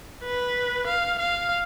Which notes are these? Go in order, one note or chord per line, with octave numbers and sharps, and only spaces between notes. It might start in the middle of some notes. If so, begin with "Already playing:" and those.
B4
F5
F5